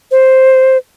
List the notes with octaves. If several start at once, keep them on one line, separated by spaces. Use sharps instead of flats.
C5